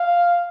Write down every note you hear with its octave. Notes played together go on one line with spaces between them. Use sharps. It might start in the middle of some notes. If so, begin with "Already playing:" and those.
Already playing: F5